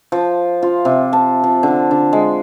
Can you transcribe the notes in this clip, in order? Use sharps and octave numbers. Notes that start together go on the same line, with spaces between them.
F3
F4
C3
A5
F3
D3
D3
G#3